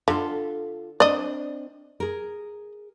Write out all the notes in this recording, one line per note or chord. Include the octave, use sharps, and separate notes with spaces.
D3 F4 A4
C4 D4 D5 D#5
G#4 A#4